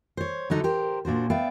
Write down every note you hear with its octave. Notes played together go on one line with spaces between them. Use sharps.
C5 C#5
D3 F#3 D#4 A4
G4 A#4 C5
A#2 D4 F#4 C5
B3 D5 E5 F5 G5